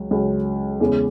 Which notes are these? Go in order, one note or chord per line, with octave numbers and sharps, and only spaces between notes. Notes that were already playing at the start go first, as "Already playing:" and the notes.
Already playing: C#2 F#3
C#2 C#3 F#3
E2 C#3 G#3